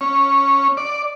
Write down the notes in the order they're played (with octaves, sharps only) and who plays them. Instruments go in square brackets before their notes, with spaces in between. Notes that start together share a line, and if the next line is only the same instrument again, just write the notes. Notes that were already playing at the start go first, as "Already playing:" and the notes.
[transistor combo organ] C#4
D5